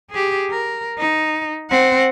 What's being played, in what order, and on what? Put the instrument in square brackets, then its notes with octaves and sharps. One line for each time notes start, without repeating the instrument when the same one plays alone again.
[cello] G4 G#4
A#4
D#4
C4 F#5